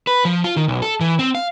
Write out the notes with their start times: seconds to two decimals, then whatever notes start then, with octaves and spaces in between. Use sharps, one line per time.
0.07 B4
0.25 F3
0.44 F4
0.57 D#3
0.68 B1
0.82 A4
1.00 E3
1.19 C4
1.35 F5